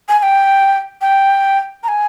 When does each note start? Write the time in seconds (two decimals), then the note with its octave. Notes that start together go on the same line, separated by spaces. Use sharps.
0.09 G#5
0.19 G#5
0.23 G5
1.01 G5
1.84 A#5
1.88 G#5